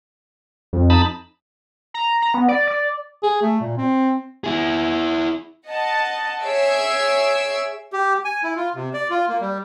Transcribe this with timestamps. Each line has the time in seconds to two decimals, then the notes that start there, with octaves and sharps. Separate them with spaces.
0.73 F2
0.90 D#4 A5 B5
1.94 A#5
2.22 A#5
2.34 B3
2.48 D5
2.67 D5
3.23 G#4
3.42 A3
3.61 A#2
3.78 C4
4.44 E4 G#4
5.67 D#5 F#5 A5
6.44 G#4 C#5 E5 E6 C7 D7
7.93 G4
8.25 G#5
8.43 E4
8.56 F4
8.75 C3
8.94 D5
9.10 F4
9.28 A#3
9.40 G3